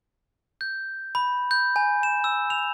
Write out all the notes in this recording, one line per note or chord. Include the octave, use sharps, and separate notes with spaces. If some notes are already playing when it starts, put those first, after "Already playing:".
G6
B5
G6
G#5
E7
E6
F7